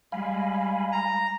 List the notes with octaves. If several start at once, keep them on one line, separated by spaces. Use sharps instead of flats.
G3 G#3 F5 G#5 B5
A#5